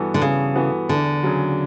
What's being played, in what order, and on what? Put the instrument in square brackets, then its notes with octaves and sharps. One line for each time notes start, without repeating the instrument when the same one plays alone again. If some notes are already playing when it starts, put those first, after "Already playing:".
Already playing: [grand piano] G2 E3 B3 F#4 A4
[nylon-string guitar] D3
[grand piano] G2 [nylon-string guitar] C#3
[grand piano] E3 B3 F#4 A4
[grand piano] E2 [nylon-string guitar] D3
[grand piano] C#3 F#3